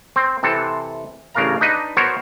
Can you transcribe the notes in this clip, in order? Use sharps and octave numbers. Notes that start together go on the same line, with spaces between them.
C4
C3 E3 C4 A4
A1 C#3 D4 A#4 F5 A#5
D4 D#4 B4 D#5
B3 F#4 A#4 C5 C#5